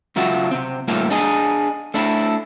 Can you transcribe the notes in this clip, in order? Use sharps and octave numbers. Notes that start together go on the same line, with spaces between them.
C#2 F#3 F4 F#4 E5 F#5
C3 C4
A2 G3 A#3 D#4 F4 E5
D4 G#4 D#5
A3 D4 E4